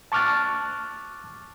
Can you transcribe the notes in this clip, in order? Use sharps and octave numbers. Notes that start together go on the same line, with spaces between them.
A5 C#6 D6 F6 F#6 A6